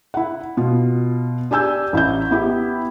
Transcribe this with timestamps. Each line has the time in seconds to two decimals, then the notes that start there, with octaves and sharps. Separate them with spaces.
0.14 E4 F#5
0.57 B2 F4
1.51 D4 G4 G#5 E6 G6
1.93 A1 E4 D#5 G6
2.31 B3 E4 G4